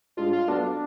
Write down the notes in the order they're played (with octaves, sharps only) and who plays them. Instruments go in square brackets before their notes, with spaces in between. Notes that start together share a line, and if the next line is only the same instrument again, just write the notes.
[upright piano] A2 G#3 D4 [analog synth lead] F4
[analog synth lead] F4
[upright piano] F#3 B3 F#4 A4 [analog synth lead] D4